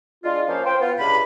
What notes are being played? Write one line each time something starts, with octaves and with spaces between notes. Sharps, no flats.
G#3 D4 F4
F3 A#3 C#4 A#4 C5 F5
C5 G5
B3 F4
C#2 G2 C3 B5